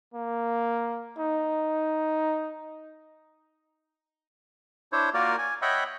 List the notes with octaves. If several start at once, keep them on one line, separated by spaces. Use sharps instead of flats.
A#3
D#4
D4 E4 C5 C#5
A#3 F4 F#4 A#4 D5
G#5
C#5 D#5 E5 F#5 G5 B5